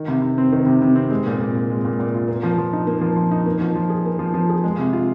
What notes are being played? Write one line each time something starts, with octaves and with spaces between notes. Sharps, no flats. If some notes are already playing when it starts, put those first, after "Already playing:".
Already playing: D#3
C3
C3
C4
D#3
C3
C3
C4
G#3
A#2
A#2
F4
G#3
A#2
A#2
F4
A#3
F3
F3
D#4
A#3
F3
F3
D#4
A#3
F3
F3
G#4
A#3
F3
F3
G#4
G#3
C3
F4